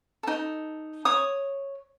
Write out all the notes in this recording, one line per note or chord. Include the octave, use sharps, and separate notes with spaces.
D#4 A4
C#5 D#6